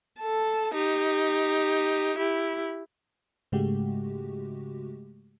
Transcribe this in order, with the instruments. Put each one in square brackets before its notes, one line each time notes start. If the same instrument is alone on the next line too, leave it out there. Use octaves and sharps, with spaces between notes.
[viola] A4 A5
D#4 G4
E4 G4
[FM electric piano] G#2 C#3 G#3 A3 F#4 G4